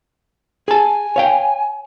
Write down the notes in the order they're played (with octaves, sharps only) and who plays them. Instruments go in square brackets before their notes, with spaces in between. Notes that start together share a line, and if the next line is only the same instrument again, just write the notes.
[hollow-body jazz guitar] G#4 A5 [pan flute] G#5
[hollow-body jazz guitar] C#5 F5 G5